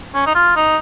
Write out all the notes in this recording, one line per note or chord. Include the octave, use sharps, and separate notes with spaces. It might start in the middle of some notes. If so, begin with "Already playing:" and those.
C#4
D#4
F4
D#4